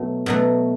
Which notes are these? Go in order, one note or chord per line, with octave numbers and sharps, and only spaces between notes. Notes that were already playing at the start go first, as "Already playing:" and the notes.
Already playing: B2 F#3 A3
B2 F#3 A3